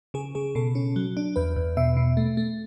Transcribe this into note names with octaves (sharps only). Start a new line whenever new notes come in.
C#3 G#4
C#3 G#4
B2 A4
C#4
F#3
D4
E2 B4
E2
B2 E5
B2
A3
A3